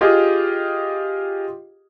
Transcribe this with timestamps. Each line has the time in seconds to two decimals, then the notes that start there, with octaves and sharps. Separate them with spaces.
0.01 F4 G4 G#4 D#5